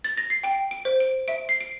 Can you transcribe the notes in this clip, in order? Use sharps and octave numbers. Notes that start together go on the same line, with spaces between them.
A6
A#6
C7
G5 D7
D7
C5
D7
E5 D7
C7
D7